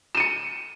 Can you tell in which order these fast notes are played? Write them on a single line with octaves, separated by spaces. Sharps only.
E7 D#7 C#7